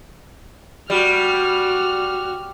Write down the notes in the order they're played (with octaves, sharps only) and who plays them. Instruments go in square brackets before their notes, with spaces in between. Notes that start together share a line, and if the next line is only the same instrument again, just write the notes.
[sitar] G3 [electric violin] F#4 F6